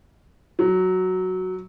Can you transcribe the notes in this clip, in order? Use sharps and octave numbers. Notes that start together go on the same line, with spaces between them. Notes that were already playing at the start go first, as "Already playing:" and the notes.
F#3